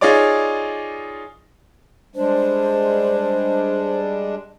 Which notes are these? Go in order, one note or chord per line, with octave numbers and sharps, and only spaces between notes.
D#4 F4 G#4 C#5 D5 D6
G3 G#3 D4 C5